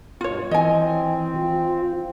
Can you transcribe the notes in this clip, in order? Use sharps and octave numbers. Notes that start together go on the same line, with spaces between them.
G2 B2 F4 C#5
E3 C4 D#5 G#5
F4